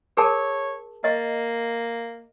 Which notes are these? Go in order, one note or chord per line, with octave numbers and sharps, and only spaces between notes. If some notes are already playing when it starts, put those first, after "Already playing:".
G#4 A#4 C#5 A5
A#3 D#5